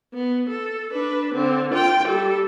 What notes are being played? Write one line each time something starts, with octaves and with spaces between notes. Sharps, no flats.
B3
A4
D4 B4
D3 C4
F4 G5
G3 A4